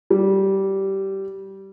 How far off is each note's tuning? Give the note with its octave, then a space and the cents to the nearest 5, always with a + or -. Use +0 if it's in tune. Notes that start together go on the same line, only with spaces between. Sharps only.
G3 -15